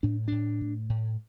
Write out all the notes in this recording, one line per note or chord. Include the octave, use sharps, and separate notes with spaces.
A2 D4
A2 D4
A2
A2